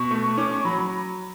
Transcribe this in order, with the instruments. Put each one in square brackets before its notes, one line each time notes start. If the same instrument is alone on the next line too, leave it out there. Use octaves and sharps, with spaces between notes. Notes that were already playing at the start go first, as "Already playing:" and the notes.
Already playing: [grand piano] B2 [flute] C#6
[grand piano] A3
[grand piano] C#4 [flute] D6
[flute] C#6
[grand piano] F#3 [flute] B5